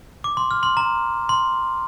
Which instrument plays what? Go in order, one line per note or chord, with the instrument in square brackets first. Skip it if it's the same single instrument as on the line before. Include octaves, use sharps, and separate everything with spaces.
[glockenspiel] D6
C6
F6
C6
A#5
C6